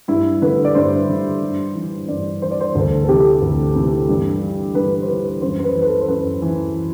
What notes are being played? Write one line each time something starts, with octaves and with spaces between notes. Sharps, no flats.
G2 E4
D3 B4
D5
G2 C5
D3
G2
E3
G2 D5
E3 C5
D5
C5
D2 A4
A4
C3 E3 G4
D2
C3 E3
G2
E3
G2 B4
C5
E3 B4
F#2 C5
C5
B4
E3
B4
A4
C5
F#2 B4
E3